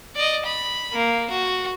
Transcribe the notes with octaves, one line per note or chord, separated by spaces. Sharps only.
D5 D#5
B5
A#3
F#4